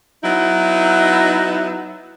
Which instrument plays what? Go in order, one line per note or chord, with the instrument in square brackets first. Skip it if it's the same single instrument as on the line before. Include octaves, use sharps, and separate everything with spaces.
[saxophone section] F#3 B3 D#4 E4